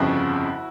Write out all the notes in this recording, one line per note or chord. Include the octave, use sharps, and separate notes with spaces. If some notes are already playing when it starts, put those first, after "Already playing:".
Already playing: G1 F2 C#3 F3 E4 F#4